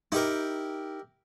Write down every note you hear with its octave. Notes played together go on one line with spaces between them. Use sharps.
D#4 E4 G4 A#4